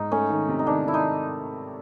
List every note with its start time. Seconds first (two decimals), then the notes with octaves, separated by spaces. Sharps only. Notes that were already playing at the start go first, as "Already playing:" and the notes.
Already playing: G#2 D#4
0.12 A3 C#4
0.30 D#3
0.49 C3
0.59 D#4
0.66 D#3 D4
0.84 D#3 E4
0.94 D#4